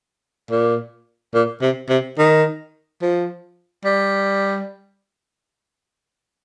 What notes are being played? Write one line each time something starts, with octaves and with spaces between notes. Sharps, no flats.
A#2
A#2
C3
C3
D#3
F3
G3